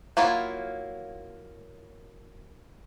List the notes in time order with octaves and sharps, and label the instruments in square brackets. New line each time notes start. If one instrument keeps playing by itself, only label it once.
[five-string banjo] F#3 A#3 E4 F4